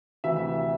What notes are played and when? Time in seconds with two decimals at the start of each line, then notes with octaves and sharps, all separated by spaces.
0.24 D2 C3 E3 E5